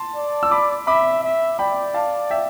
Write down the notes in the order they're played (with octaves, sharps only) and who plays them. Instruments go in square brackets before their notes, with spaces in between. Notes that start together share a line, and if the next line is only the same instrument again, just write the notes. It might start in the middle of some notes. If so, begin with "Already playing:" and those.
Already playing: [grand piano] A5 C6
[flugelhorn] D5
[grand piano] E6
B5 D6
[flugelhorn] E5 [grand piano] B5 D6
[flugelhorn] E5
[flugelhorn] D5 [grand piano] G5 B5
[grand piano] F5 A5
E5 G5